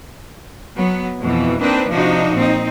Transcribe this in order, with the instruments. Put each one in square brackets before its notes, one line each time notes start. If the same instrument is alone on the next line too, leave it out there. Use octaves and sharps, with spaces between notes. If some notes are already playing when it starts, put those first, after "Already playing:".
[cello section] F#3 B3
F2 B2 E3
A#3 C4 D4 D#4 B4
C3 F3 D4 D#4 F#4
A#2 C4 D#4